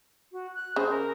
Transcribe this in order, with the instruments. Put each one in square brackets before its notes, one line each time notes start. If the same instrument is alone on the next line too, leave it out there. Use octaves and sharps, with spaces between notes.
[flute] F#4
F#6
[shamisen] C#3 [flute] C5
[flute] A#4